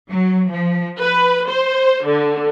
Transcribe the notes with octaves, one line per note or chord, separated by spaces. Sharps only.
F#3
F3
B4
C5
D3